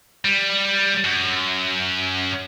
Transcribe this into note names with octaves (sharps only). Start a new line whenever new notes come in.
G3
F#2